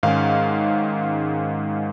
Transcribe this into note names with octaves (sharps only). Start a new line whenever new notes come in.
G#2 D#3 G#3 C#4 F5